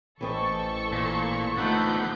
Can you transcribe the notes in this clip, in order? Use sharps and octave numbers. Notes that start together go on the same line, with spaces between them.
A1 E3 C4 A4 D#5 C#6
A#2
D3 F3 A3 B3 D#4 A4 F#5 G6